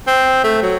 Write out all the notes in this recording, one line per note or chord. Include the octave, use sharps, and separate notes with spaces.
C4
A3
F#3